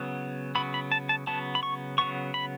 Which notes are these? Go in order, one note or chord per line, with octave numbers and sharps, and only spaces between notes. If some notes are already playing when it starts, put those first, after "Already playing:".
Already playing: C#3 F#3 B3
C#3 F#3 B3 B5
B5
A5
A5
C#3 F#3 B3 A5
B5
C#6
C#3 F#3 B3 C#6
B5